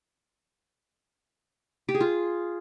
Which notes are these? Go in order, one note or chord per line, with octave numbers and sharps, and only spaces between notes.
G4
G#4
F4